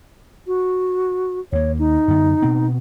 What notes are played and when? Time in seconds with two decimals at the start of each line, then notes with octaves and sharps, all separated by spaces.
0.47 F#4
1.52 D#2 A#3 C#5
1.79 D#4
2.08 F#2 D3 B3
2.42 B2 B3 C4